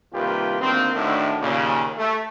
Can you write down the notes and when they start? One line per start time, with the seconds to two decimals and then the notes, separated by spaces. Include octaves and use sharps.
0.13 C2 D#3 A#3 F4 G4 B4
0.61 D2 D#3 A#3 C4
0.94 D2 A2 D3 D#3 A3
1.41 D#2 A#2 C#3
1.97 A3